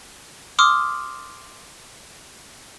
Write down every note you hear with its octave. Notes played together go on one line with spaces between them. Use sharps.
C6 D6 D#6 F6